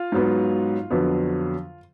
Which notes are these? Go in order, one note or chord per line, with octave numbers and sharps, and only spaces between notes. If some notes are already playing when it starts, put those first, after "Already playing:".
Already playing: F4 F5
G#2 F#3 B3
F2 D3 F#3 B3